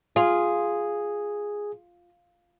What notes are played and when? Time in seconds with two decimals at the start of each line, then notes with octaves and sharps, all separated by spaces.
0.16 F4 G#4